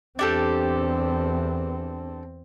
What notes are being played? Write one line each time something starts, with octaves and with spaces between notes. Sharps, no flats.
E2 C4 D4 G4 A4